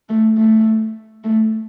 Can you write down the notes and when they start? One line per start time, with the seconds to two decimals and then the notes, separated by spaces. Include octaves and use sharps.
0.09 A3
0.38 A3
1.24 A3